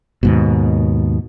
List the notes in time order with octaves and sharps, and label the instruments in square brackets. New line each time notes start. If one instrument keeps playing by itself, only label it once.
[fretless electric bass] D#2 G#2 B2